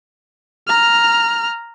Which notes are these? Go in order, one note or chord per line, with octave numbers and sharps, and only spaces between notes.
A#5 F6